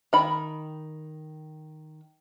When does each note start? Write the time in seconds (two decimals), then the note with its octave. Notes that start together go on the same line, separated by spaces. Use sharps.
0.13 D#3 B5